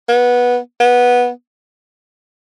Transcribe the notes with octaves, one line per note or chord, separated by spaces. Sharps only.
B3
B3